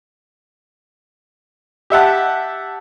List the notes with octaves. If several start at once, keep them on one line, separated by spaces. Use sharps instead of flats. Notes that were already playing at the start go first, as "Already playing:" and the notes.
G4 E5 F#5 A5